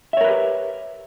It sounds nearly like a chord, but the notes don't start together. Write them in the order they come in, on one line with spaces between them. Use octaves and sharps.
E5 C#5 A#4 B4 G4